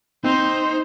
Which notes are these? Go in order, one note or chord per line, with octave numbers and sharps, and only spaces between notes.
C4 D#4 C5